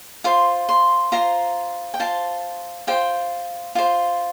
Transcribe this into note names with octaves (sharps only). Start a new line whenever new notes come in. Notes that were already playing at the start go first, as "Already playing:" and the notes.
F4 C5 C6
C6
F4 C5 A#5
G5
F4 C5 A5
F4 C5 G5
F4 C5